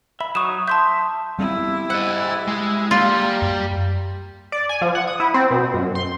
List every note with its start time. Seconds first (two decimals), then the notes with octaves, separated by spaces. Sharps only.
0.20 E5 B5
0.35 F#3 D#4 C#6 D#6 E7
0.68 E5 A5 C6 G6
1.39 G3 B3 C4 E4 G4
1.90 C5 D#5 F#5
2.47 G#3
2.91 G3 A#3 F4 A#5
3.42 F#2
4.52 D5
4.69 G#5
4.82 F3
4.95 F#5
5.07 D#6
5.20 E4
5.34 C4
5.51 B2
5.74 F#2
5.95 C6